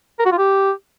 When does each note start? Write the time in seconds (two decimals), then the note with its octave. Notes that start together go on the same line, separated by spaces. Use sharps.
0.19 A#4
0.26 F#4
0.32 F4
0.38 G4